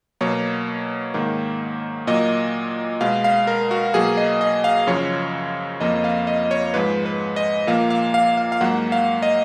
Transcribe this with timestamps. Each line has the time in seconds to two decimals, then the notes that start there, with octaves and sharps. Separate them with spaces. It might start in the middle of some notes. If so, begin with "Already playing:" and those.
0.21 B2 F#3 A#3 C#5
1.14 G#2 D#3 A#3
2.07 A#2 F#3 A#3 D#5
3.01 B2 G#3 F5
3.24 F5
3.47 A#4
3.71 F#4
3.94 B2 F#3 A#3 G#4
4.17 D#5
4.41 D#5
4.64 F5
4.87 F#2 C#3 F3 C#5
5.81 F2 F3 A#3 D#5
6.04 F5
6.27 D#5
6.51 C#5
6.74 G#2 F3 G#3 B4
7.06 B4
7.36 D#5
7.67 A#2 F3 A#3 F5
7.90 F5
8.14 F5
8.37 F5
8.52 F5
8.61 G#2 F#3 A#3 F#5
8.92 F5
9.22 D#5